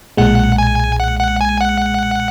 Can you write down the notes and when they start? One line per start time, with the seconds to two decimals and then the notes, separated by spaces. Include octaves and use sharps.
0.17 B1 A#2 G#3 F#5
0.58 G#5
1.00 F#5
1.20 F#5
1.41 G#5
1.61 F#5